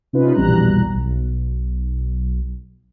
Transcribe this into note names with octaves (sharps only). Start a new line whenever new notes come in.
C3 C#4 D#4 F4 B4
A#1 E2 B2 G3 A#5 F#6
B1